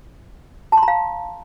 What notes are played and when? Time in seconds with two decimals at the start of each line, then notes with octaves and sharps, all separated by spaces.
0.72 A5
0.77 C6
0.83 A#5
0.88 F5